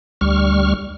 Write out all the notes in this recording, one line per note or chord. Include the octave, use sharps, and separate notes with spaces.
D2 G3 C#6 F6